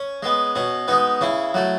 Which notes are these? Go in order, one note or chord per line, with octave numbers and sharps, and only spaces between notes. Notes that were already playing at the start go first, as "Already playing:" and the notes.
Already playing: C#4
G#3 B3
B2 C#4
G#3 B3 D#4
C#3 C#4 E4
F#3 A3